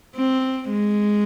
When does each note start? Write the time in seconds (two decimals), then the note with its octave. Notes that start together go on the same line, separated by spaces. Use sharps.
0.16 C4
0.70 G#3